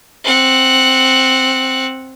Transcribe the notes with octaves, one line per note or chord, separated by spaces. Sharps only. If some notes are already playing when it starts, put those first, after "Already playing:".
C4 F#5